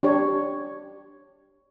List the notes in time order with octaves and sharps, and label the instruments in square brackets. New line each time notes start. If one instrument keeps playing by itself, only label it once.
[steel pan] D4 G4 C#5